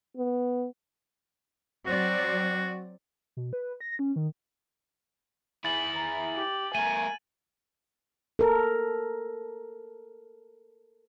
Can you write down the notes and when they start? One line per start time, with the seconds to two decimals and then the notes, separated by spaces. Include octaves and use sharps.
0.17 B3
1.86 F#3 C4 F#4 D5
3.37 B2
3.53 B4
3.81 A#6
3.99 C#4
4.16 D#3
5.65 E4 G#4 A6 F#7
5.94 A#5
6.36 G4
6.75 A3 A#4 G#5 D#7
8.39 A4 A#4